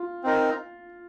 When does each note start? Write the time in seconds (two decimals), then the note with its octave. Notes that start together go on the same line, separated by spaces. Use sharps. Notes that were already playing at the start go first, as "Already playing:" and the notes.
Already playing: F4
0.23 C4 D#4 A#4